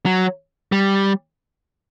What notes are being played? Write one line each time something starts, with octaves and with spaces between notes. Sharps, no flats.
F#3
G3